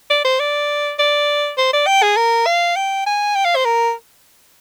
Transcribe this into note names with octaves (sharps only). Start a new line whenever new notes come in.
D5
C5
D5
D5
C5
D5
G5
G#4
A#4
F5
G5
G#5
G5
F5
C5
A#4